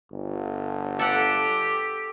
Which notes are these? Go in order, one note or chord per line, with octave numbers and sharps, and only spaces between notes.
G1
G4 A4 F#5